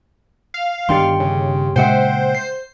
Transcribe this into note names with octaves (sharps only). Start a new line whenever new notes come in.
F5
G1 D#3 D4 G4 G5 C6
C#3
A#2 C#3 G#3 C5 E5 F#5 G5
C7